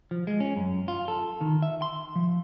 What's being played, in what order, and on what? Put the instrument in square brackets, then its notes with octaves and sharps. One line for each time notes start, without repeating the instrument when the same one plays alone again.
[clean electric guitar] F3
G#3
C#4
F#2
F4
A4
D#3
E5
C6
F3